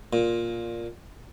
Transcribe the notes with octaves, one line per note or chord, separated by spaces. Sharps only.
A#2